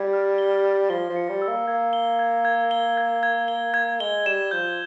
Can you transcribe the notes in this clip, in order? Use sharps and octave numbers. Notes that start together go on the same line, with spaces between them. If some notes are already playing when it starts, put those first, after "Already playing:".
Already playing: G3 G#6
F6
G7
F6
F3 G7
F3
C#7
G3
E6
A#3
A#3 G#6
G7
G#6
G#6
G7
G#6
G#6
G7
G#6
G#3 G7
G3 E7
F3 G6